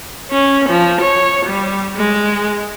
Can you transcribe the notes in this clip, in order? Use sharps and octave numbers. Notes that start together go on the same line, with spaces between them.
C#4
F3
C#5
G3
G#3